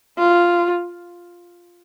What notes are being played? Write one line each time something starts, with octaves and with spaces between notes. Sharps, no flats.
F4